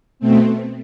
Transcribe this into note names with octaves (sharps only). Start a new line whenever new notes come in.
B2 A3 C4